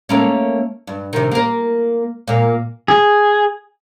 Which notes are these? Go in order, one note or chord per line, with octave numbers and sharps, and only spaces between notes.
A3 A#3 C#4
G2
C3 D#3
A#3 A#4
A#2 A#3
G#4